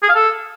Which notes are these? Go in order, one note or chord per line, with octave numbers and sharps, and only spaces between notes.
G#4
F5
A4